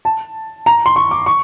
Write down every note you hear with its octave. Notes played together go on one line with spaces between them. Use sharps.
A5
A#5
C6
C#6
D6
C#6